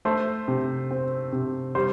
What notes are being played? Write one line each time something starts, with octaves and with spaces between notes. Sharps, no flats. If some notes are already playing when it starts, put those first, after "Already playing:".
A3 C5
C3
C4
C3
G3 C5